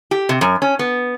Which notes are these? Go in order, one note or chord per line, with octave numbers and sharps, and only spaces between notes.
G4
C3
F#2
C#4
B3